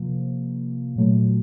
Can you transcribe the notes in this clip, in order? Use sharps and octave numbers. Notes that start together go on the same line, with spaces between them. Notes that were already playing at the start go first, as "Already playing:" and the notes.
Already playing: C3 F3 A#3
A#2 F#3 A3